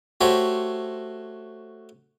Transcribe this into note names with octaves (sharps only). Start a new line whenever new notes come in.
A3 F#4 G4 C5 C#5 E5